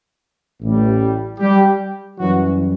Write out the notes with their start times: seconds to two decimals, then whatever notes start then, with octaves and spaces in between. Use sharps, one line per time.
0.62 A1 A2 G3
1.40 G3 G4
2.19 F#2 E3 F#3 G3 F#4